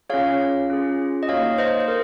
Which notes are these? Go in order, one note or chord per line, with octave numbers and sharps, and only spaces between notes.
C#4 F4 G#4 C#5 F5
C#4 F4 G#4
D#5
A#3 D#4 F#4 C#5 F5
C5 D#5
C5
A#4